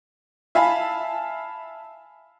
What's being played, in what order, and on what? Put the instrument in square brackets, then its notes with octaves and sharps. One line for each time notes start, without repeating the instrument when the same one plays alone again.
[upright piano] E5 F5 G#5 A5 B5